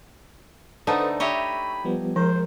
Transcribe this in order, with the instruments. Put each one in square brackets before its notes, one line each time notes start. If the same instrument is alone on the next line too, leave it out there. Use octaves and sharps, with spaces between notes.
[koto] D3 A3 D#4 [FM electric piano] A4 B4 C5 [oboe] D#6
[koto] G4 C#5 D#5 [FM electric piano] E5 C#6 [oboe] B5
[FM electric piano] F3 G3 B3
[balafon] F3 [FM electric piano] G#3 A#4 [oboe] C5